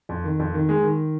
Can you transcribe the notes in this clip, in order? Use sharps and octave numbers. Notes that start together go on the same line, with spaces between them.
F2
D#3
F2
D#3
G#3
D#3